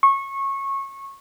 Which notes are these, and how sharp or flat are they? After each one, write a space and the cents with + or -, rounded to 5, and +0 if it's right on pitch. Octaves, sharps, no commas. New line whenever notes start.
C#6 -20